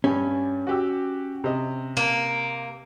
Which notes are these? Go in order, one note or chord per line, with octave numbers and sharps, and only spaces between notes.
G2 G3 C#4
F#4 G4 E6
C3 D#5
A#3